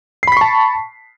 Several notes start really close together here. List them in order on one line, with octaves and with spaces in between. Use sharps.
C7 B5 B6 C#6 A5